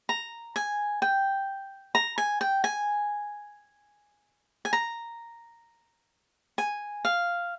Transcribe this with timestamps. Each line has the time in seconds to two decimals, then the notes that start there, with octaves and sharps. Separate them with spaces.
0.09 A#5
0.56 G#5
1.02 G5
1.95 A#5
2.18 G#5
2.41 G5
2.64 G#5
4.65 G#5
4.73 A#5
6.58 G#5
7.05 F5